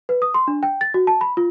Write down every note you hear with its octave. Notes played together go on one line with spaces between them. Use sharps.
B4
D#6
C6
D4
G5
A6
F#4
A5
B5
F4